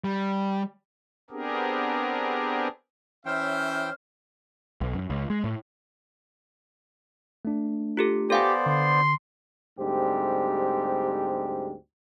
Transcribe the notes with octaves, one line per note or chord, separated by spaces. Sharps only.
G3
B3 C4 D4 G4 G#4 A#4
E3 C#4 C5 C#5 E5 G5 F6
B1
F#2
C#2
G#3
A2
A3 D4
F4 G4 A4
B3 G4 A4 C5 D5 F5 G#5
D3 C6
D2 G#2 G3 C4 G4